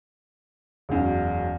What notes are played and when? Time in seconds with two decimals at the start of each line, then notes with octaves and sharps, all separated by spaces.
0.89 E1 F#2